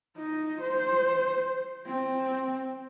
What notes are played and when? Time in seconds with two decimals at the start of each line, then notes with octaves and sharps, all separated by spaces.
0.17 D#4
0.61 C5
1.86 C4